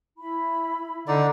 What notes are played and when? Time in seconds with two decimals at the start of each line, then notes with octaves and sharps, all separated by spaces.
0.18 E4 B5
1.08 D3 D#4 D5